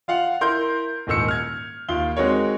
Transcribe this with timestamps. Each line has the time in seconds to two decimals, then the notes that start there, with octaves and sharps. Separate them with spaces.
0.08 F4 F5 F#5
0.41 E4 A#4 C6 G6
1.07 D#1 G#2 D#3 E6 C#7
1.28 F6 G#6
1.88 D#2 F4 G7
2.17 G#3 C4 D#4 F#4 A#4 C#5